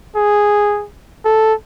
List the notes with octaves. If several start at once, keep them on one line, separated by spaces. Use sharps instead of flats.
G#4
A4